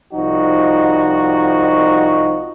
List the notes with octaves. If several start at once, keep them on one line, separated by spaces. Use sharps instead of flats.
C2 F3 D#4 F#4